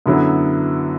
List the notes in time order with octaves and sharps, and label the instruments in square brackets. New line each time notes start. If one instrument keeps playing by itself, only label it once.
[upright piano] F#2 D3 F#3 B3 E4